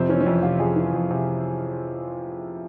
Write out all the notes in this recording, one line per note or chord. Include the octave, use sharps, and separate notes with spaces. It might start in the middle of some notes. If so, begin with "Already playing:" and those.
Already playing: F2 C3 C4
E3 C#4
C#4
F2 E4
C3 F4
F2 G#4
E3
F2
C3